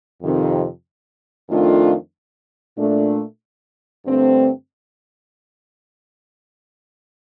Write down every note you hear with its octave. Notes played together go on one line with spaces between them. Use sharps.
F2 C3 D#3
F2 D#3 A3 D4 F4
A#2 A3 D4
G2 D3 A3 C4